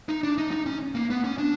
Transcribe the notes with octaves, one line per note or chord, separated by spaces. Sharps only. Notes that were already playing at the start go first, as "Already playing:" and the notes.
D#4
D4
D#4
D#4
C#4
A#3
B3
C#4
D4